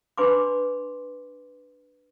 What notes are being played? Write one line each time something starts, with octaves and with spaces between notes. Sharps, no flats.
D4 B4 G#5 B5 C6 D6